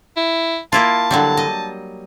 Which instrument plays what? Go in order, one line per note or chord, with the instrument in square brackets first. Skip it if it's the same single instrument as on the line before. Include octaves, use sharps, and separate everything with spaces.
[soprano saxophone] E4
[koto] A#3 E4 F4 [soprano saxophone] A5
[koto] D3 F#3 G3
D#5